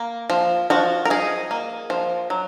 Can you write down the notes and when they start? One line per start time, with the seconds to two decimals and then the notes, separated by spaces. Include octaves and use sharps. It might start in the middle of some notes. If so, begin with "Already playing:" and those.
Already playing: A#3
0.30 F3
0.70 F3 F#4
1.05 A#4
1.10 D#4 G#4
1.51 A#3
1.90 F3
2.30 F#3